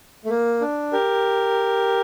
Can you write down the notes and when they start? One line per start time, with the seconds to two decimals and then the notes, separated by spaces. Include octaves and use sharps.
0.25 A3
0.30 A#3
0.61 D4
0.92 G4 A#4